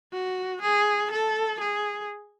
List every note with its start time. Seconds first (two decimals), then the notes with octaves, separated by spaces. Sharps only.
0.13 F#4
0.62 G#4
1.12 A4
1.60 G#4